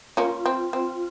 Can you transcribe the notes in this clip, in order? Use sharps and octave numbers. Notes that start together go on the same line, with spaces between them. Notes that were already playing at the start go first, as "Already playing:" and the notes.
A#3 C#4 F4
C4
C4